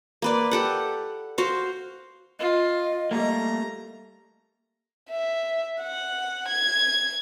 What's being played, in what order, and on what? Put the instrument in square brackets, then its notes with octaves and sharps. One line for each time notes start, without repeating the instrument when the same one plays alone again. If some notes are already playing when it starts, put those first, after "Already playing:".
[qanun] A#3 B4 D5
G4 A4 F#5
F#4 C5 F5
[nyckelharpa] F4 [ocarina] D#5
[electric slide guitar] G3 A3 A#3 [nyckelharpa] A#5
[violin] E5
F#5
G#6